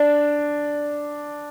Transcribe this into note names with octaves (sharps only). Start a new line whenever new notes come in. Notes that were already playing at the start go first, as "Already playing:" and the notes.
Already playing: D4